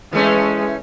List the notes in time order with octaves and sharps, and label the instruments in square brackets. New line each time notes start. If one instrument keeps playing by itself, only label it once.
[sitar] E3 A3 C#4 [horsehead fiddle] G#3